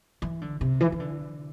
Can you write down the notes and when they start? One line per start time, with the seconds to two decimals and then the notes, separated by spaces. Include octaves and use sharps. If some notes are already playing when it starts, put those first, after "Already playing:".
0.22 E3
0.41 D3
0.61 C3
0.80 E3
0.92 E3
1.00 D3